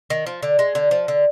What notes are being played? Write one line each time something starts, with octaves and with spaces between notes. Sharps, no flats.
D#3
F3
D3
G#3
D3
F3
D3